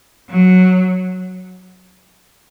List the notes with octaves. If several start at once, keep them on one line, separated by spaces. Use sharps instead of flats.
F#3